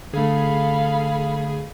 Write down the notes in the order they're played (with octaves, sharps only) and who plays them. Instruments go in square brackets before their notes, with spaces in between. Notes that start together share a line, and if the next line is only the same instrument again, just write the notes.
[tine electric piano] D3 A3 [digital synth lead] G#4 [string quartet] A4 F5 B5